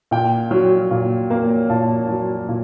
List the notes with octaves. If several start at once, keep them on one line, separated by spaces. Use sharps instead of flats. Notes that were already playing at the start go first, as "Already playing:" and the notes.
A#2 G5
F#3
A#2
A#3
A#2 A5
F#3
A#2